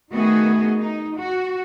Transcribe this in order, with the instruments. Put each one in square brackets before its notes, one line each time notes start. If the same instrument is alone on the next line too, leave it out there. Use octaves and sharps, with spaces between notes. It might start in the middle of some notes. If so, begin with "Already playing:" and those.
[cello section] D#3 A3 B3 F#4 G#4 D#5
D#4
F#4